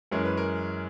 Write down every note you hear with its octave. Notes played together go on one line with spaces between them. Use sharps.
F#2 E3 G#3 C#4 A#4
B4
A#4